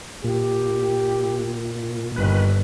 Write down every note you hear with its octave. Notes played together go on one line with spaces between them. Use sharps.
A#2 G4
G1 D#3 B4